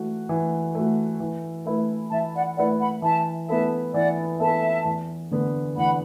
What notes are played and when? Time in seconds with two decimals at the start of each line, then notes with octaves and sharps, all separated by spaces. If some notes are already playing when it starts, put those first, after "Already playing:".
Already playing: E3 A3 F#4
0.29 E3
0.75 A3 F#4
1.20 E3
1.65 A3 E4 B4
2.11 E3 E5 A5
2.34 D5 F#5
2.57 A3 E4 B4 D5 F#5
2.80 F#5 B5
3.02 E3 E5 A5
3.48 B3 E4 A4 E5 A5
3.94 E3 D5 F#5
4.40 B3 E4 A4 E5 A5
4.85 E2
5.31 D3 B3
5.76 E2 F#5 B5